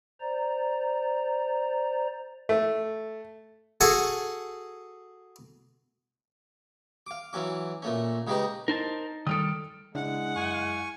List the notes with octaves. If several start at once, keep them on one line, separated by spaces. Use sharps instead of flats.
C5 D5 A#5
A3
F#4 G#4 A4 F#5 G#5
F5 D6
E3 F#3 C#4 D6
A#2 A3 C#4
C#3 G#3 D#4 G4 B4 C5
D#4 A#4 C5 A5
D#3 G3 A4 D#6 F6 D7
C#3 G#3 D4 E4 F#5
F#2 E4 G#5 C#6